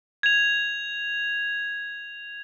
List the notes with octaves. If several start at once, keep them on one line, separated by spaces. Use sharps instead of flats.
G#6 F7